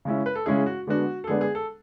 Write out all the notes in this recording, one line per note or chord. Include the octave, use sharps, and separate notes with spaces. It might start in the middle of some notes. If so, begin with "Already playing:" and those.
C#3 G#3 C#4 E4
B4
A4
C#3 G#3 C#4 E4 G#4
F#4
D3 G#3 B3 D4 F#4
A4
D3 G#3 B3 D4 G#4
G#4
A4